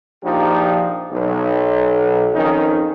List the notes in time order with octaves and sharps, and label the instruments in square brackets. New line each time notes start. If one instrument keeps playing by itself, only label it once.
[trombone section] A#1 F3 D4 D#4 G4
B1
F2 D#3 C#4 D#4